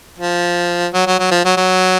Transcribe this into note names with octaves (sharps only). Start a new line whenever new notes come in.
F3
F#3
F#3
F#3
F3
F#3
F#3